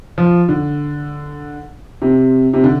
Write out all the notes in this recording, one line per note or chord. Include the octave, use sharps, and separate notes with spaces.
F3
D3
C3
C3
D3